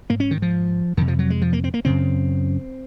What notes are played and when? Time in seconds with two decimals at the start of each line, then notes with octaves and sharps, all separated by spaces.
0.10 G#2 A#3
0.20 C#4
0.31 D#3
0.42 F3
0.97 F2 C3 D#3
1.08 F3
1.19 F#3
1.30 G#3
1.42 F3
1.53 A#3
1.64 C4
1.74 A#3
1.85 F#2 C#3 C4